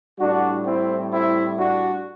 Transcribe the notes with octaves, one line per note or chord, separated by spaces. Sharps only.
A2 G3 D4 F#4
C4 E4
C4 E4
D4 F#4